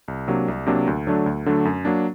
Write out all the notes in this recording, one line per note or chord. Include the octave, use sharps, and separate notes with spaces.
C2
C3 F#3 A#3 D4
C2
C3 F#3 A#3 D4
D2
D3 F#3 A3 D4
D2
D3 F#3 A3 D4
F#2
F#3 A#3 D4